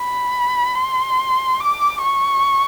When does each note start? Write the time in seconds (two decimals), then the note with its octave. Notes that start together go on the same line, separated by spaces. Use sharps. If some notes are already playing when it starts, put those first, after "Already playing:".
Already playing: B5
0.75 C6
1.60 D6
2.01 C#6